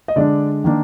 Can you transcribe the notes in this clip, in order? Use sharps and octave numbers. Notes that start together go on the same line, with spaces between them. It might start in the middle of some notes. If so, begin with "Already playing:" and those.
D#5
D3 G#3 D4 D5
D#3 A#3 D4